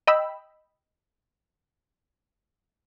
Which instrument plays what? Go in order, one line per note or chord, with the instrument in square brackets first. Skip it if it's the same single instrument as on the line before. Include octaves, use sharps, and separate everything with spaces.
[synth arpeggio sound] D#5 G5 B5 E6